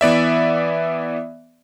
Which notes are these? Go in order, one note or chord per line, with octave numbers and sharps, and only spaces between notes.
E3 B3 D5 E5